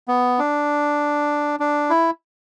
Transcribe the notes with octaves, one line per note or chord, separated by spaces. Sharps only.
B3
D4
D4
E4